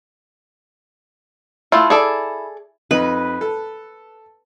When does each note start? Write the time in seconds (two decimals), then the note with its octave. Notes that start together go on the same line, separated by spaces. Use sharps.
1.72 A3 E4 F4
1.90 G#4 A4 D5
2.91 F2 D#4 B4
3.41 A4